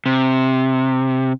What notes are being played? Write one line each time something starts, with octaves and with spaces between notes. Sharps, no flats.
C3